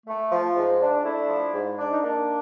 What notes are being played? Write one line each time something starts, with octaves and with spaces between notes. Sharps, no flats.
A3
F3
G#2
D4
A3 D4 E4
F3
G#2
D4
D#4
A#3 D4